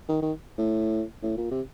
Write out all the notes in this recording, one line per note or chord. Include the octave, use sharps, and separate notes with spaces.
D#3
D#3
A2
A2
A#2
C3